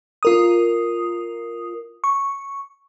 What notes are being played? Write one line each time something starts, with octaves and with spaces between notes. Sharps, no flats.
F4 A#4 D#6
C#6